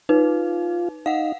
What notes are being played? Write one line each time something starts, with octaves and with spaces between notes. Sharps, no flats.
D#4 F4 B4
D#4 F5 F#5